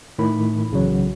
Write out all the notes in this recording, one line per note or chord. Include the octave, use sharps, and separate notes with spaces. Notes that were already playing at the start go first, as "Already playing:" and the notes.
A2 D#3 B5
B1 C#3 E3 F#3